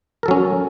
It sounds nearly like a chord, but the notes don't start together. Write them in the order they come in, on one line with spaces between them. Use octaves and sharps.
A#4 A4 F#3 C#4